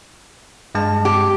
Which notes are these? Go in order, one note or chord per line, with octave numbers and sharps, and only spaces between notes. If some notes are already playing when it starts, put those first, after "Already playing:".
G2 G#3 A5
G4